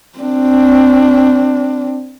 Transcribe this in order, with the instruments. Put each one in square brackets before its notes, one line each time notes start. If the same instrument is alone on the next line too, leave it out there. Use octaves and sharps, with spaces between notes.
[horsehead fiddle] C4 D4